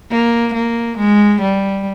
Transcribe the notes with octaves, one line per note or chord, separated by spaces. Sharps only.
A#3
A#3
G#3
G3